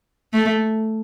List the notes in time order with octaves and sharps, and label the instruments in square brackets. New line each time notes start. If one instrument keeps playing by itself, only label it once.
[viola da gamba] A3